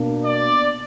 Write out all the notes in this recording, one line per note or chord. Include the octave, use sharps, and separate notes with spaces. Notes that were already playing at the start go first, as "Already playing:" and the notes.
Already playing: B2 A#3 D4
D5